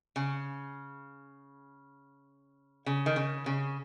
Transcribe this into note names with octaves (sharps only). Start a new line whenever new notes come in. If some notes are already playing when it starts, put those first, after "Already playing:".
C#3
C#3
D#3
C#3
C#3